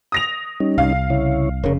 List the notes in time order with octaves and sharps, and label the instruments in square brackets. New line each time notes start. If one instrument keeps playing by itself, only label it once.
[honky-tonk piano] D#6 A#6 F7
[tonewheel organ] G3 C#4 D#4
[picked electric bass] C2 [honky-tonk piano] F5
[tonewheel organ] C#3 E4 C#5
[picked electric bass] F1 C#3 [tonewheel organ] A#4 C#5